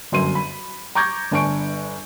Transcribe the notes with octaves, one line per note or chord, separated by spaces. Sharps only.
G1 F#2 C6 D#7
B5
A#5 C#6 D6 G6 G#6 A#6
G1 D4 G#5 C#6 D7